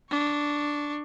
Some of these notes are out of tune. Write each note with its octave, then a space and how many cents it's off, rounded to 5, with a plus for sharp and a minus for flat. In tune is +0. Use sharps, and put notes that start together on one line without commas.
D4 +0 C#6 +10